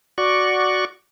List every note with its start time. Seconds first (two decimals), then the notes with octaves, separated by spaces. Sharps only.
0.18 F#4 D5 C#6